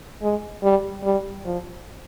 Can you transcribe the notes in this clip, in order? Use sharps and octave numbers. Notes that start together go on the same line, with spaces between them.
G#3
G3
G3
F3